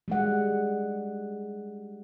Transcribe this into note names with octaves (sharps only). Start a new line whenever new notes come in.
G3 G#3 F#5